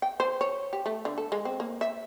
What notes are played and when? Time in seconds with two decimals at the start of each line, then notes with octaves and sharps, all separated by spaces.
0.02 G5
0.20 C5
0.41 C#5
0.73 G4
0.86 A3
1.05 D3
1.18 A4
1.32 G#3
1.45 C4
1.60 A#3
1.81 E5